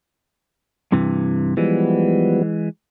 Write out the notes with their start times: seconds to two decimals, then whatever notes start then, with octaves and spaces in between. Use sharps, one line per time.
0.92 G2 C3 E3
1.57 E3 F3 G3 G#3 B3